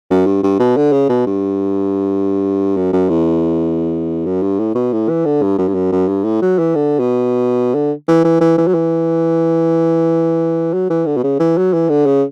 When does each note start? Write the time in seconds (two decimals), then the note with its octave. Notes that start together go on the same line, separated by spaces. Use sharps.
0.11 F#2
0.26 G2
0.43 G2
0.59 B2
0.77 D3
0.92 C#3
1.09 B2
1.26 G2
2.76 F#2
2.93 F#2
3.09 E2
4.26 F#2
4.42 G2
4.59 A2
4.75 B2
4.92 A2
5.09 E3
5.25 D3
5.42 G2
5.58 F#2
5.68 G2
5.74 F#2
5.92 F#2
6.08 G2
6.24 A2
6.42 F#3
6.59 E3
6.75 D3
7.00 B2
7.75 D3
8.08 E3
8.24 E3
8.41 E3
8.58 E3
8.67 F#3
8.74 E3
10.73 F#3
10.90 E3
11.06 D3
11.17 B2
11.24 C#3
11.40 E3
11.57 F#3
11.73 E3
11.89 D3
12.06 C#3